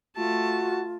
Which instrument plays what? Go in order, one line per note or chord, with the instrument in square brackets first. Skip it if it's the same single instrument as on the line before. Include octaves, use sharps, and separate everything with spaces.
[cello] A3 [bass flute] F4 [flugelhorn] F#4 [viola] A5